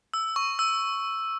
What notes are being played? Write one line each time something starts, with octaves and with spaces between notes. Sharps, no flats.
E6
C#6
E6